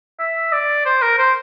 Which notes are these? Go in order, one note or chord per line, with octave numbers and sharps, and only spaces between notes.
E5
D5
C5
A#4
C5